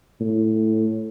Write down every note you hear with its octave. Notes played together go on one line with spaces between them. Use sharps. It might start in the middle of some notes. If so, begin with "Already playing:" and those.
A2